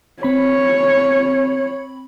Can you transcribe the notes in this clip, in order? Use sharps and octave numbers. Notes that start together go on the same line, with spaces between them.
C4 C#5 B5